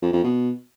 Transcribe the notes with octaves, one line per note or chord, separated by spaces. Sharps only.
F2
F2
B2